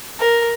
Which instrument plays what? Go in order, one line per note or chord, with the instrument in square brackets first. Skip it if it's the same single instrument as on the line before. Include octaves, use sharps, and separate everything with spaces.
[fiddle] A#4